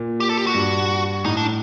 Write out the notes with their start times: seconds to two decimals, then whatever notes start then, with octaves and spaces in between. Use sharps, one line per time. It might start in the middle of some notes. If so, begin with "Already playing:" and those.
Already playing: A#2
0.20 G4
0.29 A4
0.38 G4
0.47 F#4
0.55 G2
1.25 A2 D#4
1.37 D4